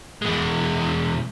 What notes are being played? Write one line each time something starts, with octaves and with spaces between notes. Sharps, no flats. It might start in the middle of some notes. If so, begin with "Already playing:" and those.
E2 G#3